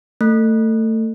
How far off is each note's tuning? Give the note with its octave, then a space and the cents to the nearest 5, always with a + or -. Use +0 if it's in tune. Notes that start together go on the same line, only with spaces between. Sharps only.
A3 +20